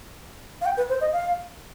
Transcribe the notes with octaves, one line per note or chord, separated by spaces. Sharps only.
F5
G5
B4
C5
D#5
F5